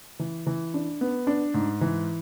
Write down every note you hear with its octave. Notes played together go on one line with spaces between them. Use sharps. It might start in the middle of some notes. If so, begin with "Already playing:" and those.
E3
E3
D4
B3
D4
G#2
E3